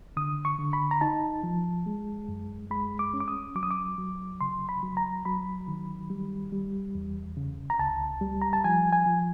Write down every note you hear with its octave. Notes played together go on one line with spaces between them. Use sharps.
D3 D#6
C#6
D3
B5
A#5
D#4 A5
F3
G#3
F#2
G#3 B5
D6
C#4
D6
D#6
F#3 D6
D#6
D6
F#3
C#3 C6
B5
F#3
A#5
F#3 B5
D#3
G3
G3
E2
C#3
A#5
C#2 A5
G3
A#5
A5
F3 G#5
G#5
F3